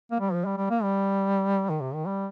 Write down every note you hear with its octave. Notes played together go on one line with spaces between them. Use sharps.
A#3
G3
F3
G3
G3
A#3
G3
D#3
C3
D#3
G3